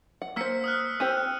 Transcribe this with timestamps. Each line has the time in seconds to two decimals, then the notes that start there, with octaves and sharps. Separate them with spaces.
0.22 F#5
0.36 A#3 C5 E6 B6 C#7
0.64 D#6 F6 F#6
1.00 C4 G4 C5 E6 B6 D#7
1.17 F#6